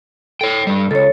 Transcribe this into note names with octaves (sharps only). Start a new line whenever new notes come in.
A4 C#5 G5
G2 G3
C#2 A4 C#5